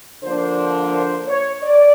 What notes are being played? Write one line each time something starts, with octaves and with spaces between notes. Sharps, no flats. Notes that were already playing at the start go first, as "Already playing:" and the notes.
D3 F3 A#3 D4 C5
C5
C#5
D5